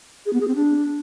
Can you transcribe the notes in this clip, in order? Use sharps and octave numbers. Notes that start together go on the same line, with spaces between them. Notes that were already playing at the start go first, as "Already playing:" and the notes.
G#4
B3
G#4
C4
D4